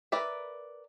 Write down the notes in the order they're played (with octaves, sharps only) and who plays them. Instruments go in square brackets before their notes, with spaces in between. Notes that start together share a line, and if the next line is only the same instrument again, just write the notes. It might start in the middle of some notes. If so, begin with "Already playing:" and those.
[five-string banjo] A#4 B4 D5 E5